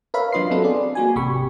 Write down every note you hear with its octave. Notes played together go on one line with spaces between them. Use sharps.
A#4 B4 C#5 E5 F5 B5
F#3 D4 F4 D#5 C6 C7
B3 C4 F4 F#4 A4 B4
G#4 D5
A#3 F#4 G#5
G#1 C3 G4 B5 C#6